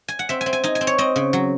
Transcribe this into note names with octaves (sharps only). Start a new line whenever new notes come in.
G#5
F#5
C4 E5
G#5
C4
G#5
D#4 G#5
G#5
C4
C#5
C4 D#5
C#3
F#3